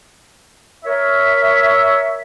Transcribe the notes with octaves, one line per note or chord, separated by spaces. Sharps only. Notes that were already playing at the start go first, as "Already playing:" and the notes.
A#4 C#5 E5